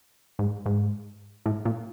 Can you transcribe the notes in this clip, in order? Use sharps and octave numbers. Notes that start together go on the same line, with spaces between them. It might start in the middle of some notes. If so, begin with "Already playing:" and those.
G#2
G#2
A2
A#2